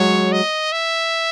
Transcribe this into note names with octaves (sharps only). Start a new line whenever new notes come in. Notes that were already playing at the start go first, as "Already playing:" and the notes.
Already playing: F#3 G#3 C#5
D#5
E5